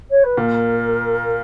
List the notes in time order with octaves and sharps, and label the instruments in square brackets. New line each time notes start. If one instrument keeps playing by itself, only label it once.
[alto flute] C#5
B4
[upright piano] A#2 [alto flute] A#4